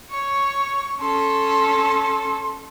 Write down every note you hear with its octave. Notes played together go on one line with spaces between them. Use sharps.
C#5 C#6
C#4 A4 C6